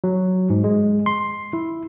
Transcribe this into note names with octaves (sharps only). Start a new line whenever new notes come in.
F#3
G#2
G#3
C6
E4